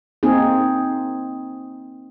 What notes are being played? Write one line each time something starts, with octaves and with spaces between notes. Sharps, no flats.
A#3 C4 D#4 G#4